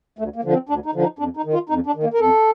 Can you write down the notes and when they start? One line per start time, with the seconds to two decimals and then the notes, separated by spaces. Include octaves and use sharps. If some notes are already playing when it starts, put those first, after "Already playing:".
0.19 D2 A3
0.36 A#3
0.44 D3 F3
0.53 C4
0.69 D2 D4
0.86 D#4
0.94 D3 F3
1.02 D#4
1.19 F2 D4
1.37 D#4
1.45 D#3
1.54 F4
1.69 F2 D#4
1.87 D4
1.96 D#3
2.03 A#3
2.14 A#4
2.19 F2 A4